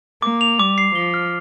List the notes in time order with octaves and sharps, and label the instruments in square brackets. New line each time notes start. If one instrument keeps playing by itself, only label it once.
[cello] A#3 [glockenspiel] D6
[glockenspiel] F7
[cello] G3 [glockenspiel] D6
[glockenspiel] C7
[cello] F3 [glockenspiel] G7
[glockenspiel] F6